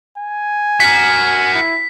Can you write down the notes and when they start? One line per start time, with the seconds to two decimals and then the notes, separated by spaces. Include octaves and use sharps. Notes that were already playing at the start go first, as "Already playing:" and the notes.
0.18 G#5
0.80 F#4 A#4 B6
1.54 E4